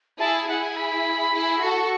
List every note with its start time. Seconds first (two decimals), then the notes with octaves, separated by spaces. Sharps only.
0.19 E4 G#4 A5
0.43 G#5
0.48 E4 G#4 F#5
0.63 G#5
0.77 B5
1.33 E4 G#4
1.62 F#4 A4 C#6